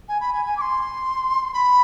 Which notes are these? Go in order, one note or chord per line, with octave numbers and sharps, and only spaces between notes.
G#5
B5
G#5
G#5
D6
C6
B5